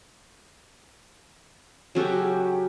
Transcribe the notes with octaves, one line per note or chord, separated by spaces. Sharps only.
C#3 F#3 C#4 F#4 G4 A4